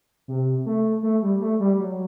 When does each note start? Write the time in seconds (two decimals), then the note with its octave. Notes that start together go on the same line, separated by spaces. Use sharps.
0.28 C3
0.66 A3
1.03 A3
1.22 G3
1.41 A3
1.60 G3
1.79 F#3